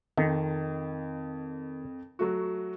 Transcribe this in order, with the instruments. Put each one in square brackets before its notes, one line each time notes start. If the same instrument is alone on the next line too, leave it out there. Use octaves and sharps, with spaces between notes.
[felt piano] F2 [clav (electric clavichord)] D#3
[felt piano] F#3 A3 F#4